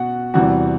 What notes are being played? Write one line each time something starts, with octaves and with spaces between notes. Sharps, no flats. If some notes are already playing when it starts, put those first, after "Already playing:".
Already playing: B2 F#4 F#5
E2 C3 E3 G3 F#4 F#5